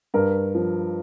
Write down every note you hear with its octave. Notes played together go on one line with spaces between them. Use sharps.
G2 A#4
F3